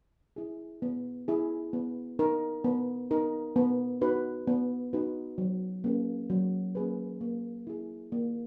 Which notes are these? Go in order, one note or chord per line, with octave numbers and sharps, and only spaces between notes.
E4 G#4
B3
E4 G#4
B3
D#4 A#4
B3
D#4 A#4
B3
D#4 F#4 B4
B3
D#4 F#4 B4
F#3
A#3 C#4 G#4 B4
F#3
A#3 C#4 G#4 B4
A#3
E4 G#4
A#3